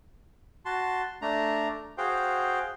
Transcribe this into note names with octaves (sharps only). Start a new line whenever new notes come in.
F#4 A5 C6
A3 D4 A#5
F#4 G#4 C5 F5 G5